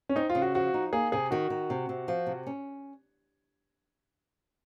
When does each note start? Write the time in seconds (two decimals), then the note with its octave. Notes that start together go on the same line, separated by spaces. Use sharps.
0.09 C#4
0.16 C4 D#4
0.30 F4
0.35 C#3
0.42 F#4
0.55 F3 F#4
0.74 D#4
0.93 A#3 G#4
1.12 C3 G#4
1.31 D#3 F#4
1.50 D#3
1.70 C3
1.89 C3
2.08 F3
2.27 C3
2.47 C#4